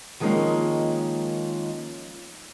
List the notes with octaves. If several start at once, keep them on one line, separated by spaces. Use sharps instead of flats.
D#3 F3 G#3 A#3 C#4 D#4